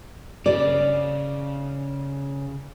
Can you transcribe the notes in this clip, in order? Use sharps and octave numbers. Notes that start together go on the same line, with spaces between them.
C#3 D5